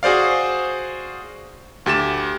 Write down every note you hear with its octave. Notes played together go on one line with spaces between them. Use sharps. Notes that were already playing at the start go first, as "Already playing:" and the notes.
F#4 G#4 C5 D5 F5
D2 G4 A6 E7